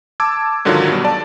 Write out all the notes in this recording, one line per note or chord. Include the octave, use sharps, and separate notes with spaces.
A5 D6 E6 G#6
G#2 D3 D#3 F#3 D4 F4
G2 B2
D5 A5